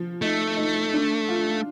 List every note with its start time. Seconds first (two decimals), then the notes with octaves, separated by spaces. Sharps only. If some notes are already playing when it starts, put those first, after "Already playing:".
Already playing: F3
0.22 A3 D#4
0.57 D#4
0.93 D4
1.29 F4